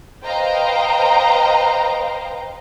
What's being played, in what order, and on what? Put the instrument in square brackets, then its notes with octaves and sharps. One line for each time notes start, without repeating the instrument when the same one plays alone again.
[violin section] B4 C5 D#5 F5 G5 A#5